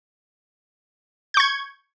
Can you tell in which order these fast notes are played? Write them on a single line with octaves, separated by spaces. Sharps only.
G6 C#6 G#6